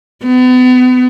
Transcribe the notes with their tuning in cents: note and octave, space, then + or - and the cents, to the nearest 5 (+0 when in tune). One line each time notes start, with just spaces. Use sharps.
B3 +35